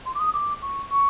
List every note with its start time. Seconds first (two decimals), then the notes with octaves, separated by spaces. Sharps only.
0.06 C6
0.15 D6
0.19 D#6
0.34 D6
0.62 C#6
0.90 C#6